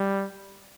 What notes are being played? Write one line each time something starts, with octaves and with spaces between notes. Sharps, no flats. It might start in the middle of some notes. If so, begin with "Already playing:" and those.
Already playing: G3